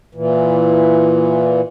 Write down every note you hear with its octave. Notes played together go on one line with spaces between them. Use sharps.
A#2 E3